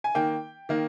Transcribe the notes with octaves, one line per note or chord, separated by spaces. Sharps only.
G#5
D#3 A#3 G5
D#3 A#3